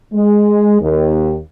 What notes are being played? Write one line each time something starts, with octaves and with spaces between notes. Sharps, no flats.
G#3
D#2